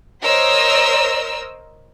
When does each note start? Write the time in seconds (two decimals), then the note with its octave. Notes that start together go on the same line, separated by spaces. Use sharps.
0.22 A#4 C5 C#5 D#5 E6